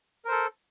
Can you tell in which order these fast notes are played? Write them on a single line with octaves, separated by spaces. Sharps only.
A#4 C5 A4